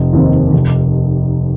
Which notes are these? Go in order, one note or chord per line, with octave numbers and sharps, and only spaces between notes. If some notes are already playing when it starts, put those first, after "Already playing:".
Already playing: F1
D#2 D#3 C4
F1